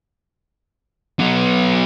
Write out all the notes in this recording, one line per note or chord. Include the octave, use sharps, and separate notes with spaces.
F#3 B3